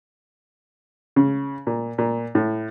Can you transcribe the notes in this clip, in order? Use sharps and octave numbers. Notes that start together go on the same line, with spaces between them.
C#3
A#2
A#2
A2